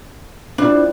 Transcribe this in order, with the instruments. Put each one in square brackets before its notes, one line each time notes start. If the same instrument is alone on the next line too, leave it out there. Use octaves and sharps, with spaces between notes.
[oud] F3 G3 E4 [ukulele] D4